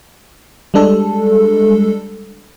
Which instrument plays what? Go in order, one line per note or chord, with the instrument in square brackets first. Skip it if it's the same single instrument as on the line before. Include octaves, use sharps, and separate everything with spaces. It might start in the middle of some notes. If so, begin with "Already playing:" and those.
[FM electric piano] G3 G#3 D4 A4